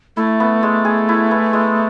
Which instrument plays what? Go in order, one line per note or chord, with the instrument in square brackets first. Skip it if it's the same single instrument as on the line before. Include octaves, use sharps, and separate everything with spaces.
[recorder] A3 [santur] E4
[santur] B3
G#3
G#4
E4
B3
G#3